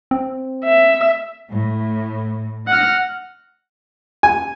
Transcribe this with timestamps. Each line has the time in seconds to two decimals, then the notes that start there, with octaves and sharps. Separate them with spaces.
0.11 C4
0.64 E5
1.49 A2
2.68 D#5 F#5 F6
4.23 G#5